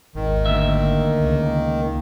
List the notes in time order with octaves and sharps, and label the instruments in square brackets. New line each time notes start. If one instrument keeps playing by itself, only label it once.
[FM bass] G#1 [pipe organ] D#2 [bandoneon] D#3
[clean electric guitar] D2 E5 [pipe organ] A#3
[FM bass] C#2